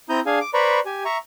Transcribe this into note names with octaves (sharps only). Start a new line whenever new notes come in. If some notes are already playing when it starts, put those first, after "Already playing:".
C4 E4 A#5 D#6 G6
D4 G#4 F5 G#5
D6
B4 C5 D5 A#5 B5 C#6
G4 G#5
E5 A#5 C#6